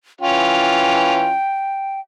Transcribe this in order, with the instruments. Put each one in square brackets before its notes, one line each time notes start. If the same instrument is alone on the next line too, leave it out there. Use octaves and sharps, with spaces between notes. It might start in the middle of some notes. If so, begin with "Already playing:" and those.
[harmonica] E3 C#4 F4 [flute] G5